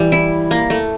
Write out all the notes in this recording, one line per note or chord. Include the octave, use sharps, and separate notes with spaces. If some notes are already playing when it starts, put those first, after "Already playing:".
Already playing: E3 G3
E4
A#3
A3